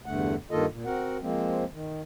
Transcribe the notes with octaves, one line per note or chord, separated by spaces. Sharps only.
E2 G2 D3 A3 F#5
G2 D#3 A#3 F4 A4 D#5
A#2
C4 F#4 A#4 F#5
F3 G#3 A#3 C4
D#3